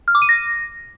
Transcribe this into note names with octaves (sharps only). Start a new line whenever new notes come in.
F6
D6
D#7
A#6